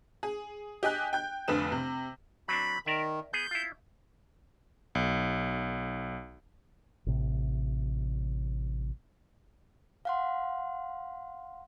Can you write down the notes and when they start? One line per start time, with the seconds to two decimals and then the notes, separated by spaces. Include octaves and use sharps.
0.23 G#4
0.83 G4 D#5 G#5 F#6
1.13 G5 G6
1.48 F1 F2 D3 B4 D#6 E7
1.72 C3
2.48 F#3 C4 D4 B5
2.86 D#3 A#4 D5 E5
3.33 B3 G#4 G6
3.51 E4 F4
4.95 B1
7.07 A1 C3
10.05 F5 F#5 C6